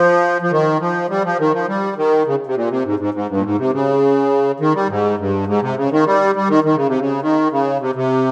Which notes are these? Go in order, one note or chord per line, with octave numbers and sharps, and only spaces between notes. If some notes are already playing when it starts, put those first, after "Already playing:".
Already playing: F3
F3
D#3
F3
G3
F3
D#3
F3
G3
D#3
C#3
C3
A#2
C3
G#2
G#2
G#2
G2
A#2
G#2
C3
C#3
D#3
G3
G#2
G2
G#2
C3
C#3
D#3
G3
G3
D#3
D#3
C#3
C3
C#3
D#3
C#3
C3
C3